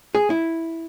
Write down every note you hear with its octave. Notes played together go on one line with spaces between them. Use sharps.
G#4
E4